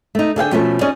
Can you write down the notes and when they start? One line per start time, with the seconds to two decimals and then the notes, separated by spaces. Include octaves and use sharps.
0.15 A3 D#4
0.36 D3 G#4 F5 G5
0.52 B2 F3 A3 C#4 A4
0.81 C#4 D#4 G#4 C#5 D5